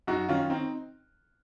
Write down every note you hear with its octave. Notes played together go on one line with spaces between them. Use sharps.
F#2 D#4 F#4
D#3 C#4 F4
C4 D#4